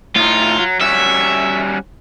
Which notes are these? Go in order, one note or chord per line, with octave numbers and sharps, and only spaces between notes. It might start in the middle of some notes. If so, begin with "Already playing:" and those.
A2 D#4 F4
F#3
G3 C#4 F#4 E5